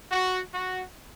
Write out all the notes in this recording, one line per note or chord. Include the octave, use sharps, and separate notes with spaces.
F#4
F#4